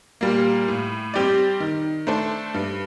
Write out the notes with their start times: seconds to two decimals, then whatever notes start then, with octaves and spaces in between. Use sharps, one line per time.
0.21 A#2 G3 A#3
0.68 A2
1.14 G3 C4 G4 D5
1.60 D#3
2.07 A3 D4 A4 C5
2.54 G2